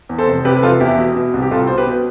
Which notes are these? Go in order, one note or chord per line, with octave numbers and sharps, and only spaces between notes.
E2
A4 C5
F1
C3 G4 B4
B4
F1 F4 A4
E2 E4 G4
B2
B2
C2
G4
C2 F4 A4
B2 C5
G4 B4
B2